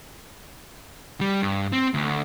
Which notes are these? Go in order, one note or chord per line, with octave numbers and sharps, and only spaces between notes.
G3
G2
C4
D2